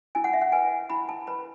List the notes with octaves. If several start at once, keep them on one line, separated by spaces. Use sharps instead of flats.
E4 G#5
F#5
E5
F#5
B4 G#5
E4 B5
A5
B4 B5